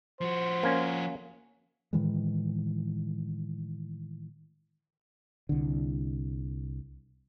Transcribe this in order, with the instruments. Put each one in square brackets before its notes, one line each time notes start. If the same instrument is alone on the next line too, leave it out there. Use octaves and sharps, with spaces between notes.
[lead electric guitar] F3 F#4 [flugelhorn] C5
[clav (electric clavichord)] A#3 C#4
[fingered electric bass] A2 D#3 E3 G#3
[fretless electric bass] C2 D3